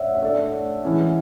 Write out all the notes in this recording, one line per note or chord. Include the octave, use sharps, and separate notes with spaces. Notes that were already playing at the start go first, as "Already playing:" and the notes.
Already playing: C#5 D5 E5 F#5
E5
A3 D4 A4 D5
E3 G#3 C#4 E4